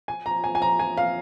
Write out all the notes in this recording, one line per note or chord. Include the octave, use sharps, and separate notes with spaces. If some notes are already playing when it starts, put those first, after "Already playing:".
G#5
A#5
G#5
G#5
A#5
G#5
F5